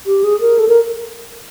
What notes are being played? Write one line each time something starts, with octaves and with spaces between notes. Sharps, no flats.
G4
G#4
A#4
A4
A#4